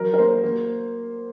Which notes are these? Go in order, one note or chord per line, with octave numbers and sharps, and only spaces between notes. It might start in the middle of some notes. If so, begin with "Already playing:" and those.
Already playing: F#3 A#4
A#4
A#3 C5
A#3